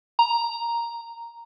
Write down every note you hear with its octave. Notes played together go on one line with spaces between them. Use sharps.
A#5